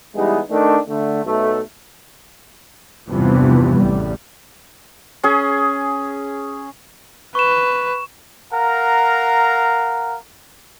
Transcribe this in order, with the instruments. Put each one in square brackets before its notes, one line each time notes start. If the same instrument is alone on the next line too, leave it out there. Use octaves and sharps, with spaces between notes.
[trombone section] E3 G3 G#3 B3 D#4 E4
D#3 A3 D4
D3 A3
B1 A3
[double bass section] E2 G2 C3 E3 F3 B3
A1 E2 G3
[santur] C#4 G#4
[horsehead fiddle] B4 [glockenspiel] C#6 E7
[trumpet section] A#4 F5 F#5 A#5